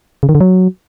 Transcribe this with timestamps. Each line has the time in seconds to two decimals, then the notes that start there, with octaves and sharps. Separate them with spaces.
0.23 C#3
0.29 D#3
0.35 D3
0.41 F#3